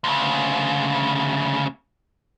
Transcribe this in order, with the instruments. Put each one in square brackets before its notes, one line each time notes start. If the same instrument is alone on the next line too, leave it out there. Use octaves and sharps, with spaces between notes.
[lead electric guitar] D2 C#3